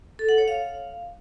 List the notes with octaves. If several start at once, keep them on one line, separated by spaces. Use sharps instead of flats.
A4
F#5
C#5
F5